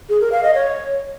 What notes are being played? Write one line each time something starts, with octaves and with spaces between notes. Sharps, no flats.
G#4
A#4
F5
D#5
C#5